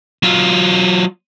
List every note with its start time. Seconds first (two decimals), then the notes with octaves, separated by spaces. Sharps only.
0.23 F#3 F4